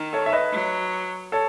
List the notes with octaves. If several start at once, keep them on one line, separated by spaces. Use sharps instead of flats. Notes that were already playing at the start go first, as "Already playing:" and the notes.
Already playing: D#3
A4 C#5
E5
B4 D#5
F#3
A4 C#5